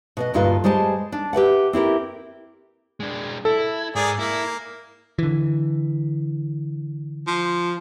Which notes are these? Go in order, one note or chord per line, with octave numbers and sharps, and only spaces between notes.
B2 B4 D#5
D2 G2 A#2 F4 B4 A5
G3 G#3 C5 G#5 A5
D4
G4 B4 E5 F#5
C4 E4 G4 A#4
G#3 D4
E4 A4
G#2 G#4 A#4 D5
A#3 E4
D3 E3
F3